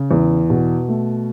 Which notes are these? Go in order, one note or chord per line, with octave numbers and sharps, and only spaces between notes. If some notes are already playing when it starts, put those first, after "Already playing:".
Already playing: C#3
E2
B2
A3